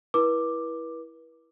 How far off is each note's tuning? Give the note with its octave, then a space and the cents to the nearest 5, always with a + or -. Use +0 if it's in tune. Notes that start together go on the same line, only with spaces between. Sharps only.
E4 +0 B4 -40 D6 +5